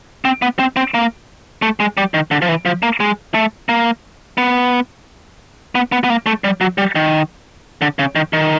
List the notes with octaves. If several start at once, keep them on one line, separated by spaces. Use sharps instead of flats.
C4
B3
C4
C4
A#3
A3
G#3
G3
D#3
D3
F3
E3
F3
A#3
G#3
A3
A#3
B3
B3
B3
B3
A#3
A3
G3
F#3
G3
D#3
D3
C#3
D#3
D#3